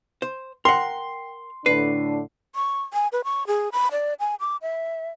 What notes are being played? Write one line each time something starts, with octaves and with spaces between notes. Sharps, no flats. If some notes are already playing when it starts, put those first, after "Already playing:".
C5
A#4 F#5 G5 C6
A2 D3 D4 B4 C7
C#6
G#5
B4
C#6
G#4
B5
D5
G#5
D6
E5